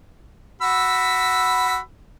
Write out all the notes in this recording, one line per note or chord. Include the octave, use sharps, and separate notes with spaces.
F#4 B5 E6